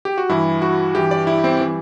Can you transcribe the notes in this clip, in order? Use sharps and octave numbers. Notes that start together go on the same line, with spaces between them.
G4
F#4
G2 E3 G3 E4
F#4
G2 E3 G3 G4
D5
E4
C4
E3 G3